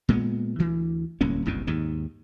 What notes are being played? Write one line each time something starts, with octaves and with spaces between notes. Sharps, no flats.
A#2 G#3 A3 B3
D2 E3
D1 C2 A#3 C#4
F#1 C2 G2 B2
D#2 G#2 D#3